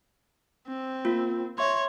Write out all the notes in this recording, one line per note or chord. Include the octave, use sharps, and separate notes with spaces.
C4
A#3 F4
C#5 E5 C6